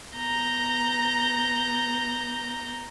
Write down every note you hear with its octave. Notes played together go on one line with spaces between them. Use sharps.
B3 A#5 G6 A#6